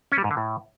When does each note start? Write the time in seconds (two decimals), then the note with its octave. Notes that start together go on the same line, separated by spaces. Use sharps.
0.12 C#4
0.18 G3
0.24 G#2
0.31 D3
0.37 A2